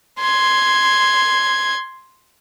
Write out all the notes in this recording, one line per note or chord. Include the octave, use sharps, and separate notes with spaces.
C6 G#6